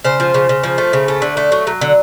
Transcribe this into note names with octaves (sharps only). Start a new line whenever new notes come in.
C#3 C5
F3
C#3
C#3
F3
A3
C#3
A3
D3
A3
F#3
F#3
D3